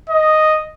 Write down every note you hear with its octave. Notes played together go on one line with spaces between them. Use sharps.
D#5